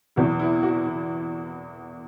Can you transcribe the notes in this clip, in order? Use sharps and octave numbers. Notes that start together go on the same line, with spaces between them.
E2 B2 F#3 E4
E4
F#4
E4